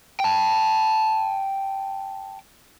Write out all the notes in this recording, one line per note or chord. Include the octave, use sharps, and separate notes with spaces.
G5 A5